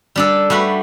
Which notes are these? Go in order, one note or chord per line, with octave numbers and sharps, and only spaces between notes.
G3 D4 A4
G3 A3 F#4 B4